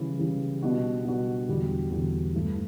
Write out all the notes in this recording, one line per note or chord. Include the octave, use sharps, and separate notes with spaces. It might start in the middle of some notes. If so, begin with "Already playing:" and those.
Already playing: C#3 E3 G3
C#3 E3 G3
B2 G3 D4 F#4
B2 G3 D4 F#4
E2 D3 G3 D4 F#4
E2 D3 G3 D4 F#4
G2 E3 A3